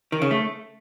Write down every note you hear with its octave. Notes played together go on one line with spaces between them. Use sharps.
D#3
C#3
A3